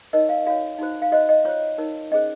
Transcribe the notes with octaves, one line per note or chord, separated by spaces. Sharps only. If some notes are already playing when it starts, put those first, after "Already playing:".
D#4 A#4 C#5 D#5
F5
F#4 C#5 F5
D#4 F#4 C5
F5
F#4 C5 D#5
D#5
F4 C5 C#5
D#4 A#4 C#5
C#4 G#4 C5 D#5